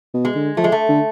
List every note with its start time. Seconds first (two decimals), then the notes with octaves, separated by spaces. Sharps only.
0.14 B2
0.25 G#3
0.35 D3
0.57 F3 A3
0.64 G#3
0.72 A3
0.88 D3